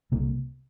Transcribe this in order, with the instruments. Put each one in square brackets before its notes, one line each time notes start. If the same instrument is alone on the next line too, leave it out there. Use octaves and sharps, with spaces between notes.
[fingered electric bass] C2 C3 A#3